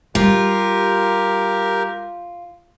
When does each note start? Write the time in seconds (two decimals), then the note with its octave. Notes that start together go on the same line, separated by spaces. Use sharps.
0.15 G3 F4 G4 A#4